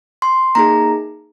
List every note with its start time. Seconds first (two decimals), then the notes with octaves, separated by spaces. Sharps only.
0.22 C6
0.55 A#3 D#4 G#4 A#5